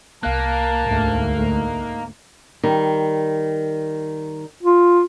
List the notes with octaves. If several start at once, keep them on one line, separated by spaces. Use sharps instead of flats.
C2 A#3 F5 A5 F#6
D2 G#2 A3
D#4
D#3 G3
F4